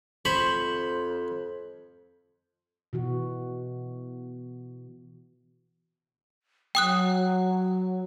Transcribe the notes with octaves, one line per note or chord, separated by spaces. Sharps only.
F2 C5 C#5 B5
B2 E3 F#4
F#3 G5 D#6 F#6